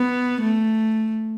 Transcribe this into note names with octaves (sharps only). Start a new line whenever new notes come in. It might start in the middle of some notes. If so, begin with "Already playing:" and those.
Already playing: B3
A3